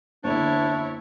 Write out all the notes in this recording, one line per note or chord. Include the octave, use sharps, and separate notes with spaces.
F#1 E2 D3 D4 E4 C#5